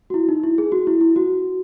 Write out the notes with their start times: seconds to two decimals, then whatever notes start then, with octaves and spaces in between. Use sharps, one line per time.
0.10 F#4
0.14 E4
0.29 D#4
0.44 E4
0.58 G#4
0.72 F#4
0.87 E4
1.01 E4
1.16 F#4